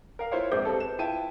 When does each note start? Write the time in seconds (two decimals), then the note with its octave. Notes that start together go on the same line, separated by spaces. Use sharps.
0.19 A#4 F5
0.32 E4 F4 C5 C#5 F5
0.52 A#1 G#2 C4 D6 G6
0.65 G3 C4 A4
0.78 B4 E7
0.99 E4 F4 G5 A5 D#7